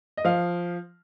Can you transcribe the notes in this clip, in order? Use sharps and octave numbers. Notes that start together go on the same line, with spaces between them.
D#5
F3 F5